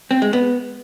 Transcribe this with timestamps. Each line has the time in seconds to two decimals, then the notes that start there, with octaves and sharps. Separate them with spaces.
0.11 C4
0.22 G#3
0.33 B3